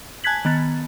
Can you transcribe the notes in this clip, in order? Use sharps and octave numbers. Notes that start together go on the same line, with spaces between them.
G#5 A5 F#6 G#6 B6 F#7
D#3 B3 A6